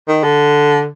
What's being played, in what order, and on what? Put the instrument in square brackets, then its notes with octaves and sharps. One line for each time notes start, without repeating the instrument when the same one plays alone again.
[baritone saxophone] D#3
D3